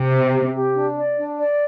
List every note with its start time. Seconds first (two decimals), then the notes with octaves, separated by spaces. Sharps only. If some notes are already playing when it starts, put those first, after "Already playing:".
Already playing: C3
0.12 C5
0.33 G4
0.54 G4
0.75 D4
0.97 D5
1.18 D4
1.39 D5